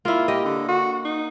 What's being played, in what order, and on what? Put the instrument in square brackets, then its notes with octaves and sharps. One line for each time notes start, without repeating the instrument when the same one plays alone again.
[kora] A#3 E4 [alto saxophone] F4
[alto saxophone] G4 [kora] D#5
[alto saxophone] D3
F#4
D#4